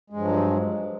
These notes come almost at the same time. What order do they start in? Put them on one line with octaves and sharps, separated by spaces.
G#3 G2 F3 F#3